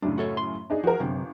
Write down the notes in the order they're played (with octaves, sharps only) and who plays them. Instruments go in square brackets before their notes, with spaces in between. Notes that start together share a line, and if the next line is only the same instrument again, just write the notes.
[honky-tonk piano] F#2 A2 C#3 [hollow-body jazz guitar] D4
[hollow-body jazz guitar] F#4 A4 C#5
C6
[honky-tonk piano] D4 D#4 G#4
[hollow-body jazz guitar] F3 [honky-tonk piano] F#4 G#4 A#4
[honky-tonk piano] G1 [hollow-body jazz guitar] F#2 C3